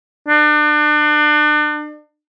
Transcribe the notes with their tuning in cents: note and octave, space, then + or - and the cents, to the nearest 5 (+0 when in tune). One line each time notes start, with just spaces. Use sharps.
D4 +35